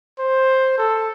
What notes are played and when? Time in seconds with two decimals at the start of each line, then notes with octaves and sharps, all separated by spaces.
0.19 C5
0.78 A4